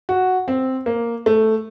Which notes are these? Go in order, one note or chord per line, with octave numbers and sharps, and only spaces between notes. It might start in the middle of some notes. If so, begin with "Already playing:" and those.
F#4
C4
A#3
A3